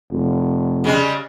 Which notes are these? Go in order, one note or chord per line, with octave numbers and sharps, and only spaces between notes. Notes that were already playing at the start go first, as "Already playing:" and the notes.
F1
C#3 G3 G#3